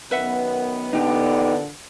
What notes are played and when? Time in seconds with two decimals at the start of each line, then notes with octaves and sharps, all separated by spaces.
0.11 F#2 D#3 B3 B4 E5 F#5
0.93 E2 A#2 D3 B3 D#4 G4